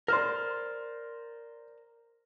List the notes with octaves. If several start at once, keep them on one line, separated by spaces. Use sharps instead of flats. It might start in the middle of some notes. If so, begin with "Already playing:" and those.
A#4 C5 D5 C6 F6